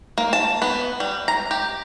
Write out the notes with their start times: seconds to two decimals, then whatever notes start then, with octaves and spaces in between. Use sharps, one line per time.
0.18 A#3
0.33 A5
0.62 B3
1.00 G3
1.28 A#5
1.51 G4